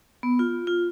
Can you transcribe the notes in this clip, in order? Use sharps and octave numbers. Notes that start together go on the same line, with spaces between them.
B3
F4
F4